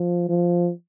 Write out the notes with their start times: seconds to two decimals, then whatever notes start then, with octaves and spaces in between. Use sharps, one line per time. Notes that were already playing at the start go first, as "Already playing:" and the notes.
Already playing: F3
0.29 F3